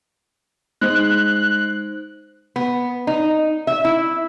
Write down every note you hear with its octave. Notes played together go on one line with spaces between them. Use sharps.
G#3 D#4 C5 F#6
B3
D#4
E5
E4